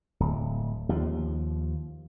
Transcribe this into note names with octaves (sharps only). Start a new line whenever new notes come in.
D1
D#2 F3